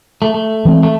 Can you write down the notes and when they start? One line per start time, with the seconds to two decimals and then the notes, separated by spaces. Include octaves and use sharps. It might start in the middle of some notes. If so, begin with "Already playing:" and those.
0.22 A3
0.34 A3
0.65 E3 G#3 C4
0.83 A3